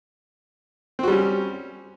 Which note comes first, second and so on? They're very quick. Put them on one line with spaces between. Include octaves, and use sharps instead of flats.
C4 F#4 G3 C#4